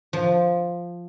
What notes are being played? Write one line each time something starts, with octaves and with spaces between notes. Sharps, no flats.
F3